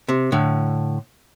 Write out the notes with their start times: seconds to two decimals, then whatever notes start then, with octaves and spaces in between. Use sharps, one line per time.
0.08 C3
0.32 A2 D3